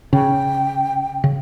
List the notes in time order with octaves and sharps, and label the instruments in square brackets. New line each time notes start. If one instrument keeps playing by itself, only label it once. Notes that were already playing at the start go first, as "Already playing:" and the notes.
[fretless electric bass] C#3 [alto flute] G5
[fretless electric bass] C#3